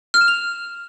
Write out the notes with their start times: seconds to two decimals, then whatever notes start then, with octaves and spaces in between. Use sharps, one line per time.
0.14 F6
0.21 E7
0.28 F7